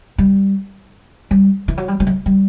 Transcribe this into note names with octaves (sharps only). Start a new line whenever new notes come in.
G3
G3
E3
F#3
G3
G3
F#3
G3